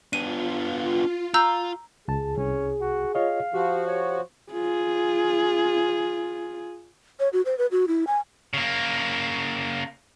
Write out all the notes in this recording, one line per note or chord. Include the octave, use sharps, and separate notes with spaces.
B3 D4 F4 D#7
F4 A#5 E6 G6
C#2 G#4 A5
C2 C#4
F#4
F4 C#5 D#5 F5
F3 F#4 G4
C#5
F4 G#4
C#5
F#4
C5
B4
F#4
E4
G#5
C#3 A#3